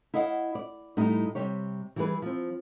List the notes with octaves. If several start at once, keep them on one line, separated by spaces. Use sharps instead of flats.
E4 C#5 D#5 F5 F#5
D5
A2 G3 D#4 E4
C3 G3 G4 C#5
E3 G3 E4 G#4 B4
F3 C4